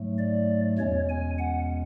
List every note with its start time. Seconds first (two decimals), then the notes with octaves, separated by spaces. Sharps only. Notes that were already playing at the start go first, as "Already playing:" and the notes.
Already playing: G#2 F#3 A3
0.18 D5
0.78 E2 B2 G#3 C#4 C#5
1.09 G#5
1.38 F#5